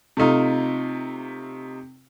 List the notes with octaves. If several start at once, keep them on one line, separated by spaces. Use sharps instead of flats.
C3 A3 D#4 F4